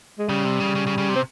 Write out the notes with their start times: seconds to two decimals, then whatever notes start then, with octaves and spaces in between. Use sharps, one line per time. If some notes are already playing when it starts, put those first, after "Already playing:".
0.19 G#3
0.29 C#3 G3
0.45 C3
0.60 C#3
0.75 C#3
0.87 C#3
0.98 C#3
1.09 C3
1.15 C4